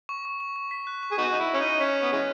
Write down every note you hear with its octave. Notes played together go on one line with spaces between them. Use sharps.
C#6
C#6
C#6
C#6
B6
F#6
C#6
G#4
B3 D#4 F#4 F#6
D#4 F#6
E4
F#6
C#4
D#4 B6
C#4 B6
C#6
B3
E3 G#3 C#4 B6